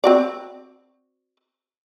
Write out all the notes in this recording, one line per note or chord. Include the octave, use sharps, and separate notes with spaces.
C4 F#4 D5